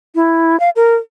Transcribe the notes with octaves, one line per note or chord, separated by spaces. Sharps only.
E4
F5
A#4